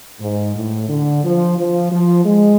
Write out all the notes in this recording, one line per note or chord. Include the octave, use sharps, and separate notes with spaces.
G#2
A2
D3
F3
F3
F3
G#3